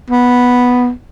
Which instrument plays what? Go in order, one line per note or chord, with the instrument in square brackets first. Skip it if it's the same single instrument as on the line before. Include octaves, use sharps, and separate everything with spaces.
[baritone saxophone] B3